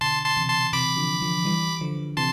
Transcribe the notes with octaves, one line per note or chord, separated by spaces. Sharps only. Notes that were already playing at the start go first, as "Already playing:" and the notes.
B2 D3 A5 C6
A5 C6
C3 E3
A5 C6
C3 E3 B5 D6
D3 F3
D3 F3
E3 G3
D3 F3
C3 E3 A5 C6